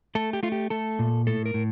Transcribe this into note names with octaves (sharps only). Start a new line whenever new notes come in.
A3 A4
G4
A3 F4
G4
A3 A4
A#2
A2 A4
A#4
A2